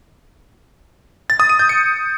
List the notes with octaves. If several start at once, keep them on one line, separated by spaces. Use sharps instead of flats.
A6
D#6
D#7
G6
C#7